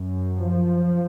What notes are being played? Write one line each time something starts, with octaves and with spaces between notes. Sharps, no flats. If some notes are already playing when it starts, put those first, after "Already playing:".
Already playing: F#2
F3